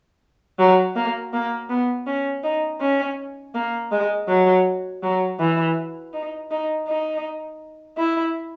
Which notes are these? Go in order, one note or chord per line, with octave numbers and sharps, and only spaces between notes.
F#3
A#3
A#3
B3
C#4
D#4
C#4
A#3
G#3
F#3
F#3
E3
D#4
D#4
D#4
E4